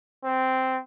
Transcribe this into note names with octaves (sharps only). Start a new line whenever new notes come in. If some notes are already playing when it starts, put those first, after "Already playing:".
C4